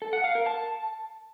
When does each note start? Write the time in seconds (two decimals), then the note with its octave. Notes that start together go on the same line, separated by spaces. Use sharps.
0.02 A4
0.13 F#5
0.24 F5
0.35 A#4
0.46 A5